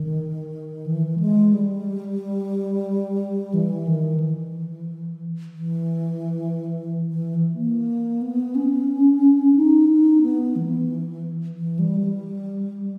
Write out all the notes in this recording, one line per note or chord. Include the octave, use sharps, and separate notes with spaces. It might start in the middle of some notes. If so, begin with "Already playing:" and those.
Already playing: D#3
E3
G#3
G3
E3
D#3
E3
E3
E3
A#3
B3
C#4
D#4
D#4
B3
E3
E3
G3
G3